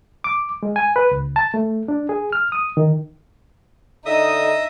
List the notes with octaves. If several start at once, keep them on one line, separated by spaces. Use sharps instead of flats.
D6
G#3
G#5
B4
C#2
A5
A3
D4
G#4
F6
D#6
D#3
D3 D#4 D#5 E5 D#6